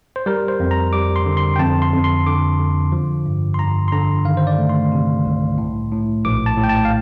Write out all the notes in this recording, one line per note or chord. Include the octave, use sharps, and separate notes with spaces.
C5
G3 A#4
C5
F2
A#5
G3 D6
C6
D3
C6
G5
F2 A5
C6
F2
C6
D3 D6
D3
F3
G2
C6
G2 A#5
C6
D3 A#5
D#3 F5
C5
D5
A3
C6
C3
C2
A2
A2
A#1 D6
A5
A2
G5
A5
F5